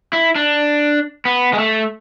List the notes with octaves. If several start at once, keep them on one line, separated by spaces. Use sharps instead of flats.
E4
D4
B3
G#3
A3